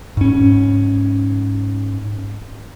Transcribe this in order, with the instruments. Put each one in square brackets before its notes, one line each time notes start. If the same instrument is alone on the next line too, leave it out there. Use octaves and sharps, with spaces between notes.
[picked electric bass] G#2 C#4